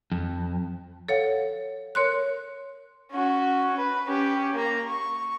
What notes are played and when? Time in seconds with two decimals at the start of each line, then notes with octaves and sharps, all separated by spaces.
0.12 F2
1.08 A4 C#5 F5 F#5
1.95 A#4 C#5 C6 F#6
3.12 C#4 F#4
3.78 B4
4.07 C#4 G4
4.55 A#3 A#5
4.88 C#6